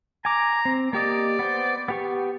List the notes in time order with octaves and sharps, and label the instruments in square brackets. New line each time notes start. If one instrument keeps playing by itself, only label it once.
[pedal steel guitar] G#5 D6 [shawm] A#5
[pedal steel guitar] C4
[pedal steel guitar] A#3 G4 D#5 [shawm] D5
[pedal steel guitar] B3 C5
B3 G4 C#6